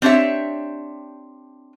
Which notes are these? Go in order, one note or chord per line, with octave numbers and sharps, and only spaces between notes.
C4 D4 G4 C#5 E5